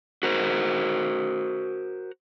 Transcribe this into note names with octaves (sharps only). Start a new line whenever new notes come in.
F#4 A#4 C5